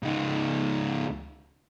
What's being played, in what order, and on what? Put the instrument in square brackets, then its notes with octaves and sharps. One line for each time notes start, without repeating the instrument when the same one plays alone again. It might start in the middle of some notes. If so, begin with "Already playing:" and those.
[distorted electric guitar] C#2 D#4